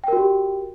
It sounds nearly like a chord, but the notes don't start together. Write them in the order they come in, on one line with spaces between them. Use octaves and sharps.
G5 A#4 F#4 G4